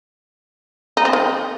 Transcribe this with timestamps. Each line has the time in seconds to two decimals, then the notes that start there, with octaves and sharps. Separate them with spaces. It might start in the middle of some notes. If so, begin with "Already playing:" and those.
0.97 D#4
1.05 C4
1.13 D#3